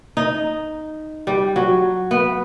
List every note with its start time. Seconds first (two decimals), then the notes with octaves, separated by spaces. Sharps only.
0.17 D#4
1.27 G3
1.56 F#3
2.11 B3